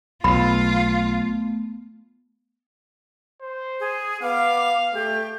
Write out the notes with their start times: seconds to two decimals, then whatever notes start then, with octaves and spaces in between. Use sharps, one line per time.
0.24 B1 A3 B3 F4 B5
3.42 C5
3.80 G#4
4.22 B3 F5 D6
4.94 A3 G4